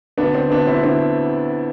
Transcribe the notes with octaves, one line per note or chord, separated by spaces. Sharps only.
D2 B3 D4
D3 C4
D2 B3 D4
D2 C4 E4
D3 C4 E4